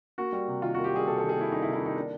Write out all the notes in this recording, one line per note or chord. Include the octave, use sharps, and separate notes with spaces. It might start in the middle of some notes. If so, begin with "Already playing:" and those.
A#3 F#4
G3
C3
D#3 F4
F#4
A#3
G4
G3 G#4
C3 A4
A4
D#3
G#4
A#3 E4
G3 D#4
E4
C3
E4
D#3 D#4
A#3 D4